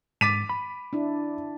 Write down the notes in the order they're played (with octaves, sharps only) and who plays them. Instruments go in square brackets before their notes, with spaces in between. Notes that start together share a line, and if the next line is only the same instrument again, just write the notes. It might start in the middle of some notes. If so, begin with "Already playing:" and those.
[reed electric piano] G#2 A6 [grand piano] D6 B6 D#7
[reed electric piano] B5
[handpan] D4 E4